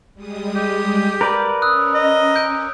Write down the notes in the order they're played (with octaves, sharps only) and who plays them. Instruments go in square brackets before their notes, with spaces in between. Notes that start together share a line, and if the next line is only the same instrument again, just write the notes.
[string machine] G3 G#3 D#6
[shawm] G4
[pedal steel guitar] A#4 B4 D5
[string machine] C#4 [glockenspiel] D#6 E6 F#6
[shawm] D#5
[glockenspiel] G6 D7